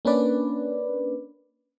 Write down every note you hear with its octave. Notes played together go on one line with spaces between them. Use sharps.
A#3 C#4 D4 B4 D5